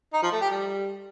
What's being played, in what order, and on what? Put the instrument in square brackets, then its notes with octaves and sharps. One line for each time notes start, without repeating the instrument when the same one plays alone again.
[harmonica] D#4
F3
A3
G4
G3